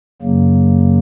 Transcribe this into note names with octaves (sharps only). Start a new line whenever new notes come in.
F#2 C#3 F#3 A#3